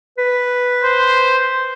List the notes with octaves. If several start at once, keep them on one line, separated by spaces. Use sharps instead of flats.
B4
C5